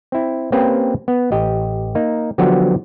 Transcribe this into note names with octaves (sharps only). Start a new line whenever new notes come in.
C4 E4
A#3 C4 C#4 G4 B4
B3
A1 G4 D#5
A#3 D#4
D3 F3 F#3 B3 F#4 G4